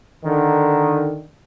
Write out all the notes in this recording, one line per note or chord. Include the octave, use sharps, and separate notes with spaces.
D3 D#3